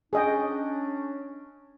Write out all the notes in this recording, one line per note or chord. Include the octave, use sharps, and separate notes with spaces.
C#4 D4 G#4 D#5 G5